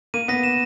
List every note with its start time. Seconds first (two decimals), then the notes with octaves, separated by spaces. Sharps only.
0.14 A#3 D#7
0.28 B3 A#6
0.43 E7